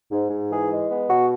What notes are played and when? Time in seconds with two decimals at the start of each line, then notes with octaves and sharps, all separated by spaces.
0.11 G#2
0.30 G#2
0.50 E3 G#4
0.70 G#3
0.90 B3
1.09 B2 F#4